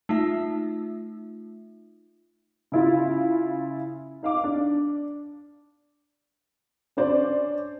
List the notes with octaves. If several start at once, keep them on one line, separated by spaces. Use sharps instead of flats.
A3 D#4 F4 E5
C#3 E4 F4
D#4 F5 D6
D4
C#4 D4 C5 D5